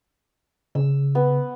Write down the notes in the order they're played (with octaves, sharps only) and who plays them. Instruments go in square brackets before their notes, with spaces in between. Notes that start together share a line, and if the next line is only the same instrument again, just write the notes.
[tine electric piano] C#3 [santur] E6
[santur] B3